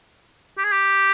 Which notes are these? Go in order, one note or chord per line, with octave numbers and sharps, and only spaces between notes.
G4
G#4
G4